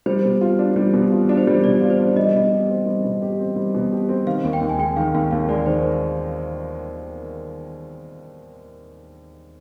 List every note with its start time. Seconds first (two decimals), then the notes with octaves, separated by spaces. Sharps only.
0.06 G3 C5
0.25 B2
0.41 F4
0.59 D4
0.76 G3
0.94 B2
1.12 F4
1.29 D4
1.37 C5
1.47 G3
1.64 B2 D5
1.81 F4
1.90 C5
2.00 D4
2.16 G3 D#5
2.34 B2
2.51 G4
2.70 C4
2.86 G3
3.04 B2
3.22 G4
3.40 C4
3.56 G3
3.74 B2
3.92 G4
4.09 C4
4.27 D#3 F5
4.44 D#2
4.53 G5
4.61 D#2
4.69 G#5
4.79 G#3 G5
4.96 D#3 F5
5.14 D#2 F5
5.31 D#2 F5
5.49 G#3 D5
5.66 D#3 C5